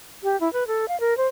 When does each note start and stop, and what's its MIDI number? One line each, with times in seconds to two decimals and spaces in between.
0.23 0.39 67
0.41 0.51 64
0.53 0.67 71
0.67 0.88 69
0.88 0.99 77
1.00 1.16 70
1.17 1.27 72